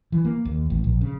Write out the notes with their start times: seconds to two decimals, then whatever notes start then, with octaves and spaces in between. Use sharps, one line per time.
0.12 E3
0.25 A#3
0.45 D#2
0.70 A1
0.84 A#1
1.01 C#3